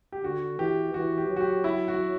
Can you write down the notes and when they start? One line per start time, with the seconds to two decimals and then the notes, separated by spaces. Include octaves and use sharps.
0.12 G4
0.24 D3 F#4
0.59 E3 G4
0.94 E3 F#4
1.18 G4
1.29 F#3
1.36 F#4
1.41 G4
1.64 E4
1.88 F#4